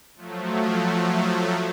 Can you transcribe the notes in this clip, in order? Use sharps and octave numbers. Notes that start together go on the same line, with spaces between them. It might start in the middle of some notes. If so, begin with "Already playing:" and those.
F3 F#3 A3